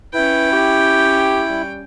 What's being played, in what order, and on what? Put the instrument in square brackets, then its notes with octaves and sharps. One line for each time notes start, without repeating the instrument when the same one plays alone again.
[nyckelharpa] C#4 G5 [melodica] E4 [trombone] B4
[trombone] G4
G3